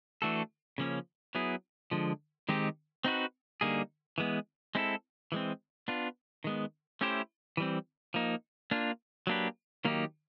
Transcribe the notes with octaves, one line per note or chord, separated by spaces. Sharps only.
E3 A3 D4 F#4 A4
C#3 F3 A#3 C#4
F#3 B3 E4 G#4
D3 F3 G#3
D#3 G#3 C4 D#4 G4
C4 D#4 F#4 B4
D3 G3 A#3 D#4 G#4
E3 G#3 B3
G#3 C4 E4 A4
E3 G#3 C4
B3 D4 F4
D#3 G#3 B3
A3 C#4 E4 G4 C5
E3 G3 C4
F3 A#3 D#4
A#3 D4 F4
F#3 A#3 D4 G4 B4
D#3 F#3 A#3 D#4 G4